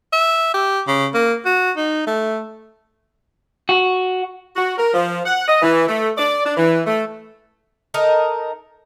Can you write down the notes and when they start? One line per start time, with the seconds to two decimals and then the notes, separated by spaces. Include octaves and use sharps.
0.13 E5
0.54 G4
0.88 C#3
1.14 A#3
1.45 F#4
1.77 D#4
2.07 A3
3.69 F#4
4.56 F#4
4.77 A#4
4.93 F3
5.26 F#5
5.48 D#5
5.62 E3
5.88 A3
6.17 D5
6.45 D4
6.57 E3
6.87 A3
7.94 D#4 A4 A#4 D#5